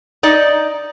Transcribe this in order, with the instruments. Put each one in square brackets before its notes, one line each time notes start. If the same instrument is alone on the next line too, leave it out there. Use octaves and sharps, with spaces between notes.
[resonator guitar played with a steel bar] D#4 D5 D#5